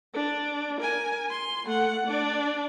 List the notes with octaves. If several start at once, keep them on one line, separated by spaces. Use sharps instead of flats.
D4
A#4 G#5
C6
A3 F#5
D4 D5